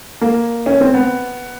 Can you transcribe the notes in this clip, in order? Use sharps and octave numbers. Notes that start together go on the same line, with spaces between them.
A#3
C#4
C4
B3